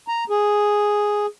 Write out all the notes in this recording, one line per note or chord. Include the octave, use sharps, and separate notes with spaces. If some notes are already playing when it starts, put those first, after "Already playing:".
A#5
G#4